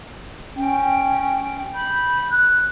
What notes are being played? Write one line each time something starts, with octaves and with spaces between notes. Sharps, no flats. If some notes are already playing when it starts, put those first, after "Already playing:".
C#4 G5
B5 G6
F#6